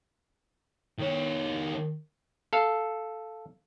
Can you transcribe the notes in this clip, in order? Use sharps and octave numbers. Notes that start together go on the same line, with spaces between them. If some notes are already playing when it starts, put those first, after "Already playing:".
D#3 C#5
A4 F5